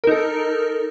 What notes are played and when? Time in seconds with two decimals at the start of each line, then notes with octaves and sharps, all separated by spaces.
0.04 A#4
0.07 D#4
0.11 A4